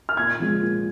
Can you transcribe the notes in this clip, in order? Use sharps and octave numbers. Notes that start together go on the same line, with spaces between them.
F6
A#2 G#6
F3 G#3
A#2